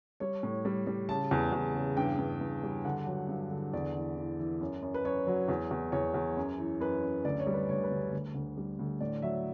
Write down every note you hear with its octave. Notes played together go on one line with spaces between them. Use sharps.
G3 C#5
A2
G3
G3
C#3 A5
E2
E2
C#3
G2 G5
G2
G2
G3
D3 F#5
F#3
G2
D3
E2 D5
E3
E3
E3
F#2
F#2
B4
F#2 C#5
F#3
E2
E2
E2 C#5
E2
F#2
E3
F#2 B4
F#2
D2 D5
C#5
G3
B4
D2 C#5
B4
D2
D2
D2
G3
D2
A2 D5
F#3 E5